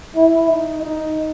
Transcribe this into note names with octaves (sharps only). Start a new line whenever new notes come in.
E4
D#4
D#4